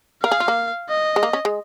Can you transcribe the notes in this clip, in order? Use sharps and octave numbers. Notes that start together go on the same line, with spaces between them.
A#4 F5
G#4
F4
A#3
D#5
G#3
A#3
C#4
G#3